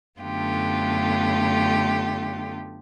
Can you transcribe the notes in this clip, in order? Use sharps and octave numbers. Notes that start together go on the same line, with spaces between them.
F#2 D3 A3 B3 F4 G4